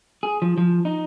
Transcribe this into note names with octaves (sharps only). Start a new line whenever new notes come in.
G#4
F3
F3
D#4